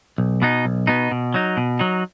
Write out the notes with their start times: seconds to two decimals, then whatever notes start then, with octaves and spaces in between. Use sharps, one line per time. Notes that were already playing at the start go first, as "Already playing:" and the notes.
0.18 B1
0.42 B2 B3 D#4
0.65 B1
0.87 B2 B3 D#4
1.11 B2
1.34 F#3 D#4
1.57 B2
1.80 F#3 D#4